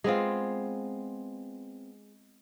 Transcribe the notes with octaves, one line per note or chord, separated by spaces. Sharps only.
G#3 B3 C4 F4